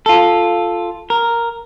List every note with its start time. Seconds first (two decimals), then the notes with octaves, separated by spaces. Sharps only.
0.06 F4 A4
1.10 A#4